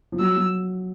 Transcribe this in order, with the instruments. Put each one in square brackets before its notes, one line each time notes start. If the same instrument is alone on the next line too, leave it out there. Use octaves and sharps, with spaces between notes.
[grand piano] F3
[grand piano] F#3 [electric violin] E6
[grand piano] F#3